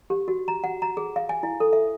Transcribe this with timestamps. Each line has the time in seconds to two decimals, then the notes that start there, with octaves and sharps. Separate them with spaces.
0.10 G4
0.28 F#4
0.48 A#5
0.64 F#5
0.82 A#5
0.97 G#4
1.16 F5
1.29 G#5
1.43 E4
1.60 A4
1.73 E5